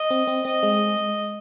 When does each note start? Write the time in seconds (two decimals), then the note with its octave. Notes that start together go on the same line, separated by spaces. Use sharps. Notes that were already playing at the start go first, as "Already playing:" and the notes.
Already playing: D#5
0.10 C4
0.27 C4
0.45 C4 D#5
0.63 G#3